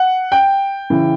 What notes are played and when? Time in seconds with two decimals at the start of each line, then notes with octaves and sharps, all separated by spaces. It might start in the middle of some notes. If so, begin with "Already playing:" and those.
Already playing: F#5
0.32 G5
0.90 C#3 E3